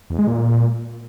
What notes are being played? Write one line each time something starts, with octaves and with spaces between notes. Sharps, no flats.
E2
G#3
A#2